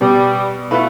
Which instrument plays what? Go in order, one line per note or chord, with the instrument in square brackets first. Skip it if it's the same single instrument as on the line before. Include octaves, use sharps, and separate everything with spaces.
[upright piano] B2 [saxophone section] G3
[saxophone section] B2 A3 [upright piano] E4 F4 B4